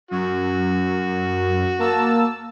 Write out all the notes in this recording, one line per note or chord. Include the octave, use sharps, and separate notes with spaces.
F#2 F#4
A#3 A5 E6